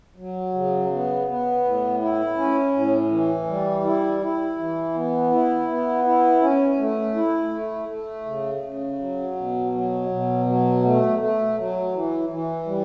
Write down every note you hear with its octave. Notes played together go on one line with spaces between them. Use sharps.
F#3
C#3
B3
B3
A2
E4
C#4
A2
E3
G3
E4
E4
E3
B3
E4
B3
E4
C#4
A3
E4
A3
A3
C#3
C#3
F#3
B2
F#3
B2
F#3
A3
A3
F#3
E3
E3
G3